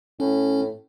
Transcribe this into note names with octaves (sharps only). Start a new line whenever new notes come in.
A2 C#4